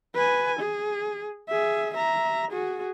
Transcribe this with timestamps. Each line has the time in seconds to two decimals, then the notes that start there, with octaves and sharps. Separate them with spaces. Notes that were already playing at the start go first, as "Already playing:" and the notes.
0.14 B4 G#5
0.59 G#4
1.48 G#4 E5
1.94 E5 A#5
2.51 F#4 G#4